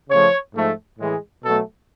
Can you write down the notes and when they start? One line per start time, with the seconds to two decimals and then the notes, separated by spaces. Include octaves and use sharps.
0.09 C#3 F3 A3 C#5
0.55 G#2 F3 A3
0.99 A2 E3 G#3
1.45 B2 F#3 A3 A4